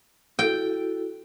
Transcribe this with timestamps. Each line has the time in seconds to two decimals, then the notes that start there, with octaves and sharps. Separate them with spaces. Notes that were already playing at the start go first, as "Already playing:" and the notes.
0.39 E4 F#4 A4 G5